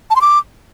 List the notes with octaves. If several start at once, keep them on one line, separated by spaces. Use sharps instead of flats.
A5
C6
D6